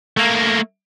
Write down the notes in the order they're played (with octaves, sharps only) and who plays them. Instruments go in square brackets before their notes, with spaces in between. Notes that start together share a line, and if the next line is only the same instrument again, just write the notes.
[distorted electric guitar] A3 A#3